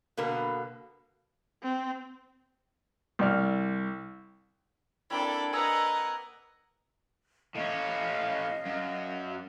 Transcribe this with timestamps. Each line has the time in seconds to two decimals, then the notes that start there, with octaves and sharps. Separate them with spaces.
0.17 B2 D3 A#3 B3
1.63 C4
3.19 C2 D5 F6
5.10 A#3 C4 D4 E4 A4 G5 B5
5.53 A#4 B4 D#5 F#5 G#5 A#5 D#6 E6
7.55 A2 C#4 D#5 F5
8.66 F#2